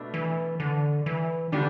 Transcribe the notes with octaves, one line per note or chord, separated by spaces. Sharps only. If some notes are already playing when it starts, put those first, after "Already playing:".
Already playing: B2 A3 D4
E3
D3
E3
D3 G3 D4